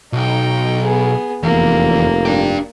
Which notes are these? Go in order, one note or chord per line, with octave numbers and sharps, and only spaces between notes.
B1 D#4 G5
B3 G#4
F1 E2 A#3
D4 G4